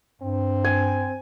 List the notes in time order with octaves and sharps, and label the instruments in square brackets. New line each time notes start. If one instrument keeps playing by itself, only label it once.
[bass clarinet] G2 [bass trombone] C4
[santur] G#5